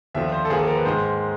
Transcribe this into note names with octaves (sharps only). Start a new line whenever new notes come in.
D#2 D3 F3 E5
C5
A4
D#2 D3 F3 A#3 G#4
A4
A#4
B4
G#2 D#3 G#3 C5